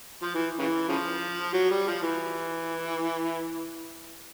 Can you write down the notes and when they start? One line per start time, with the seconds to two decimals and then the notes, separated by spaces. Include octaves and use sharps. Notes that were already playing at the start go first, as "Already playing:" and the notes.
0.23 F3
0.35 E3
0.59 C#3 E3
0.88 C#3 F3
1.53 F#3
1.71 G3
1.87 F3
2.03 E3